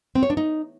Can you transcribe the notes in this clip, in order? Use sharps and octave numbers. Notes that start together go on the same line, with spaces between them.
C4
C#5
D4
D#4